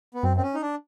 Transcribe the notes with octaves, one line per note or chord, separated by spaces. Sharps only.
B3
F#2 C4
C4
C#4
D#4
D4